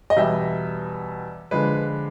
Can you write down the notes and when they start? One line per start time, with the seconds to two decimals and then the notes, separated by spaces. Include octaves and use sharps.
0.10 D#5
0.16 E2 B2 G3 E5
1.51 D3 F3 G#3 B4